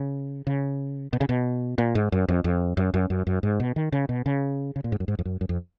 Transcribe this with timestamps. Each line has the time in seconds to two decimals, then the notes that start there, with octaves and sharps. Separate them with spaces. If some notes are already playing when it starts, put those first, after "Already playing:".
Already playing: C#3
0.47 C#3
1.13 B2
1.21 C#3
1.29 B2
1.78 A#2
1.95 G#2
2.12 F#2
2.28 F2
2.44 F2
2.77 F#2
2.94 F#2
3.10 F#2
3.27 F#2
3.43 G#2
3.60 B2
3.76 D#3
3.92 C#3
4.09 B2
4.26 C#3
4.76 C#3
4.84 A#2
4.92 G#2
5.00 F#2
5.08 G#2
5.19 F2
5.25 F#2
5.41 F#2
5.49 F2